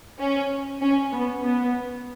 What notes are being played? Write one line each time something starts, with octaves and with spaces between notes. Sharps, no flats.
C#4
C#4
B3
B3